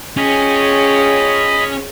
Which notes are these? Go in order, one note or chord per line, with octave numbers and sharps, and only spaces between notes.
C#4 F4 G#4 C#5 D#5 G5 B5